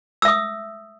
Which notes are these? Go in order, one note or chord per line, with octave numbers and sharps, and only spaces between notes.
E5 D#6 E6